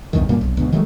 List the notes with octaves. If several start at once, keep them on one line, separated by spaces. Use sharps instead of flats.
B1 E2 G2 D#3
F#2 A#2 G3 A#3
B1
G#1 D2 B2
D#3 F#3 G#3 A3